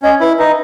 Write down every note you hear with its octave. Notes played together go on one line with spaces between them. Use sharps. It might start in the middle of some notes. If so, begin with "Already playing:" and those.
C#4 D#5
E4 B4
D#4 B4